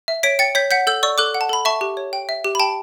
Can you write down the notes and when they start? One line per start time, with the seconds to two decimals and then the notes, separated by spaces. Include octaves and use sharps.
0.08 E5
0.23 C#5 B6 D7
0.39 G5 A6 C#7
0.55 C#5 G6 B6
0.71 F#5 G6 B6
0.87 A4 E6 G6
1.03 D5 C#6 E6
1.18 A4 D6 F#6
1.34 F#5
1.41 A5
1.49 A4 B5
1.65 E5 A5 C#6
1.81 G4
1.97 C#5
2.13 G5
2.29 E5
2.44 G4
2.55 B5
2.60 G5 A5